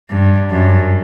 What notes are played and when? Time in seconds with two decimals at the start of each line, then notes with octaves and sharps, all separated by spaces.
0.10 G2
0.50 F#2